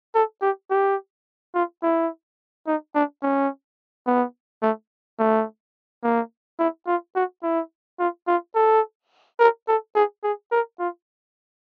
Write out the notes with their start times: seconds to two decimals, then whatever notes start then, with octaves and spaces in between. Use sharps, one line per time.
0.15 A4
0.42 G4
0.70 G4
1.54 F4
1.83 E4
2.67 D#4
2.95 D4
3.23 C#4
4.07 B3
4.63 A3
5.19 A3
6.03 A#3
6.59 E4
6.87 F4
7.15 F#4
7.43 E4
7.99 F4
8.27 F4
8.55 A4
9.39 A#4
9.68 A4
9.95 G#4
10.23 G#4
10.52 A#4
10.79 F4